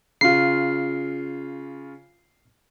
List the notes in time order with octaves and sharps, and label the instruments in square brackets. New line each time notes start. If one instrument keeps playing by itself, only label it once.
[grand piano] C#3 F4 [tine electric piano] C7